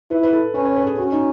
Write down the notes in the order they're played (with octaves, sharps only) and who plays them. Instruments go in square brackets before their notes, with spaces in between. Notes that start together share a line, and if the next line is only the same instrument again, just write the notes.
[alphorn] E4 [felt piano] B4
[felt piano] B4
A4
[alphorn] C#4 [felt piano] B4
[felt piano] C#5
B4
A4
G#4
[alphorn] C#4 [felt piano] F#4
[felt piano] D#4